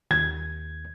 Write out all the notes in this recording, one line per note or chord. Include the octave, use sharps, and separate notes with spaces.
D#2 G#6